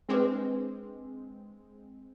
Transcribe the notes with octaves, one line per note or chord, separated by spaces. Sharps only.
G#3 C4 D4 G#4 B4